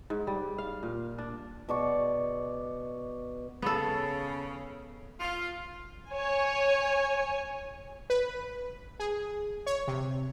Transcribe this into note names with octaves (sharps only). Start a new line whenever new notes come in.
G#2
G3
F5
A#2
D4
B2 D5 C#6
C#3 B3 A4
F4
C#5 G#5
B4
G#4
C#5
C3